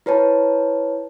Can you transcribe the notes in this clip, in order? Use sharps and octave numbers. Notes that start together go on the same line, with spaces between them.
E4 B4 C#5 A5